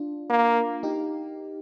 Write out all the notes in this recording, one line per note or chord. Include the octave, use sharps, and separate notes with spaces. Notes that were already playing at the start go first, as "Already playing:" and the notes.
Already playing: D4 F4
A#3
D#4 G4